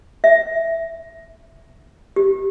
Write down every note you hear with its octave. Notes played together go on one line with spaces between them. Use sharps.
E5
G4